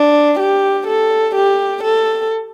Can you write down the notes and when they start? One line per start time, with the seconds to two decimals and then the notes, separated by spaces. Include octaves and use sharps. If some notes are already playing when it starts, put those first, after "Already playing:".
Already playing: D4
0.40 G4
0.87 A4
1.35 G4
1.83 A4